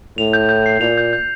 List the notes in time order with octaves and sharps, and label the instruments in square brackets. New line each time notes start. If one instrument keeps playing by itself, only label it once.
[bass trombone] A2 [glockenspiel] F7
[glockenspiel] G6
G6
C7
[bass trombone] A#2 [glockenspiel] F7
[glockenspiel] G6
G6